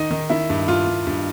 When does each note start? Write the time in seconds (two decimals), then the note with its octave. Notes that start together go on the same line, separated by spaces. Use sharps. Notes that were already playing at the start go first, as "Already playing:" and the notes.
Already playing: D#3 D#4
0.11 D#3
0.30 D#3 E4
0.50 G2
0.68 G2 F4
0.87 G2
1.07 G2